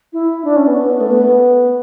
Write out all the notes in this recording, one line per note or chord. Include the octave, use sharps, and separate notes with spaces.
E4
D4
C#4
B3
A3
B3